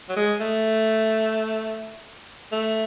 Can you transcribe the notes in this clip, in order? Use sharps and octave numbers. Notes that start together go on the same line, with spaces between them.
F#3
G#3
A3
A3